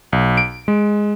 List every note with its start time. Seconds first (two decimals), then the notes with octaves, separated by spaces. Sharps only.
0.13 B1
0.37 D7
0.68 G#3